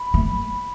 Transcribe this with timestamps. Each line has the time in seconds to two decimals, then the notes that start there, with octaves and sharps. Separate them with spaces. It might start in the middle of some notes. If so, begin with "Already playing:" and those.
Already playing: B5
0.14 A3